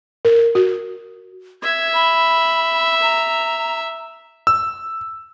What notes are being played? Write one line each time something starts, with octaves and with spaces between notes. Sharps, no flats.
A#4
F#4
E5 G#6
B5
A#5
E6